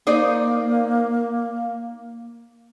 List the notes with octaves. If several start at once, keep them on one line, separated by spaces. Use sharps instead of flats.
A#3 D#4 C5 D5